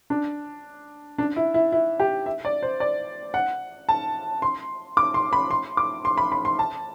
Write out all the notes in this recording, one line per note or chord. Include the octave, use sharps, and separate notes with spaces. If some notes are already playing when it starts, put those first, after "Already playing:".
D4
D4
E4
E4
E4
G4
E5
D5
C5
D5
F#5
A5
C6
D6
C6
B5
C6
D6
C6
B5
B5
C6
A5